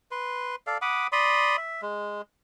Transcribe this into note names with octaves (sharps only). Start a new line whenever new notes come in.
B4 C6
A4 D5 F5
F#5 B5 D6 D#6
D5 B5 C6 D#6
E5
G#3